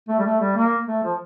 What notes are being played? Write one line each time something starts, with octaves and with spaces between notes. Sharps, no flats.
A3
G3
A3
G3
A#3
A3
F3